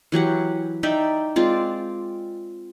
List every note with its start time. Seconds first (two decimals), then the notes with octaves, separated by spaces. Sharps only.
0.12 E3 F#3 G4 F#5
0.83 D#4 D5 E5 G5
1.36 G#3 C4 F4 D5